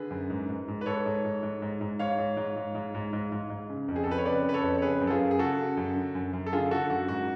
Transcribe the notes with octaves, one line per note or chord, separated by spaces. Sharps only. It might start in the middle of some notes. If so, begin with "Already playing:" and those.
Already playing: D3 G#4 B4
F#2
G#2
G#2
G#2
B4
G#2 A4 C#5
G#2
G#2
G#2
G#2
G#2
G#2 C#5 F5
G#2
G#2
G#2
G#2
G#2
G#2
G#2
G#2
C#3
F2
G#4
A4
F2 B4
C#5
C#3 B4 D5
C#3 B4
A4 C#5
F2
C#5
C#3 G#4 B4
F#2
A4
F4 G#4
F#2
G#4
C#3 F#4 A4
C#3
F#2
D3
F#2
F#2
A4
D3 F4 G#4
D3 F#4 A4
F#2 F#4
G#2 F#4